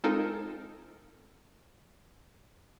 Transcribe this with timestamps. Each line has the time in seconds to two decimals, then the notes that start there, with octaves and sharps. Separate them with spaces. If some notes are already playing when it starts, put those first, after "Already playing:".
0.04 G#3 C4 D#4 F4 A4 A#4